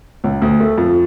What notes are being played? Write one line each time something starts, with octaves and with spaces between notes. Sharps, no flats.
C#2
D2
A3
F2